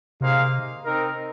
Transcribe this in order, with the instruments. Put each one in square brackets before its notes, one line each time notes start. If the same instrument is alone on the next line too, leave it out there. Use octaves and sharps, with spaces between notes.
[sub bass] C3 [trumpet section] A#3 D#4 G#4 C5 F5
[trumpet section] C4 D#4 A#4